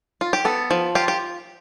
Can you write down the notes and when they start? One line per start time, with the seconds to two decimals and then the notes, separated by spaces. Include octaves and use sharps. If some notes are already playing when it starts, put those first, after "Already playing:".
0.21 F4
0.33 G4
0.45 B3 A4
0.71 F3
0.95 F4 G4
1.08 G4